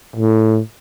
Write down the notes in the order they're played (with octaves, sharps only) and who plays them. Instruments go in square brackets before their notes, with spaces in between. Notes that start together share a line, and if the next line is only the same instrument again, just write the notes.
[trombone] A2